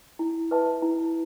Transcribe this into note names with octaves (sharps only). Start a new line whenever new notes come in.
E4
B4 E5 A5
E4